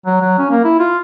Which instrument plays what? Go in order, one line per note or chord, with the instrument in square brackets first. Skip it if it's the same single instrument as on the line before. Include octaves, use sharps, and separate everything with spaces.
[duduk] F#3
F#3
C#4
A#3
E4
F4